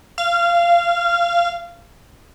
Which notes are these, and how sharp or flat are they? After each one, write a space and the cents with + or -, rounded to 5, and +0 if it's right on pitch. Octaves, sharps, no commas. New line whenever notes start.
F5 -20